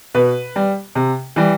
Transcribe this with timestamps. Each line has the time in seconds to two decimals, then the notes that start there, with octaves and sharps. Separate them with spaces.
0.14 B2 B4
0.56 G3
0.95 C3
1.36 E3 G3